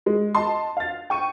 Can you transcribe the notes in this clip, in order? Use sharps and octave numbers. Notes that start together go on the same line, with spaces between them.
G#3
D#5 A5 C6
F5 A6
G5 C#6 D#7